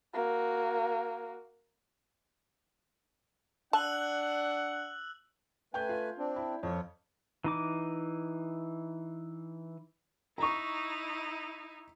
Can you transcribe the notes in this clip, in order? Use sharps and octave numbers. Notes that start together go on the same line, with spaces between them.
A#3 F#4
D4 F#5 A5 E6 F#6 F#7
A3 B4 G5 G#5 G6
F4
C4 D4
E4
F2 F4 C#5
E3 D#4 D6
D#4 E4 A#5 C#6